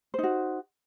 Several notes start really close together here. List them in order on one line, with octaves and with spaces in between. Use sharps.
C5 D#4 F#4